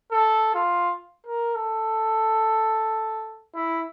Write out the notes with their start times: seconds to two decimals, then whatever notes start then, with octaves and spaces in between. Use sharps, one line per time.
0.12 A4
0.54 F4
1.26 A#4
1.55 A4
3.55 E4